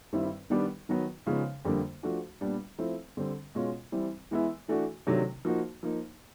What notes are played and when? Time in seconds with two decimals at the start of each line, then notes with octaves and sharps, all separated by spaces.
0.13 G2 D#3 G3 C4 E4
0.50 D#3 G3 B3 D4 G4
0.89 D#3 F#3 B3
1.26 C#3 F3 G#3 B3 D#4
1.65 F2 D3 G3 A#3 D4
2.03 F3 A3 D4 F#4
2.41 A#2 G3 B3 D4
2.78 F3 A3 C4 E4
3.17 D3 G3 C4
3.55 B2 G#3 C#4 F4
3.92 E3 G3 C4 E4
4.31 E3 G#3 B3 E4
4.68 E3 A3 D4 F#4
5.07 C3 D#3 F#3 A3 D4
5.45 F3 A#3 D#4 F#4
5.83 F3 A#3 D#4